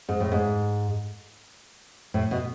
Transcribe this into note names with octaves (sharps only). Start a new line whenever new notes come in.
G#2
A2
G#2
A2
B2